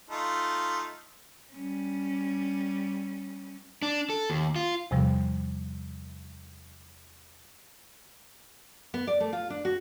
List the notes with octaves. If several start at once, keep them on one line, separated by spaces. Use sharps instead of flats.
A3 D#4 F4
G3 C#4
D4
A4
D#2
F4
E2 C3 F3 G3
B3
D5
A3
F4
D4
F#4